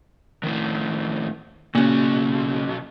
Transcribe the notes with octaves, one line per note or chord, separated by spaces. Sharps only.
A2 D#3
B1 A#2 C#3 F#4